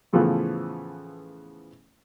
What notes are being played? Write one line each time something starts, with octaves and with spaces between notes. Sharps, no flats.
A2 C#3 E3 F3 A3 B3